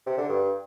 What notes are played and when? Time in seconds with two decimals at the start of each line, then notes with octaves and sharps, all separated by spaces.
0.06 C3
0.18 D3
0.29 G2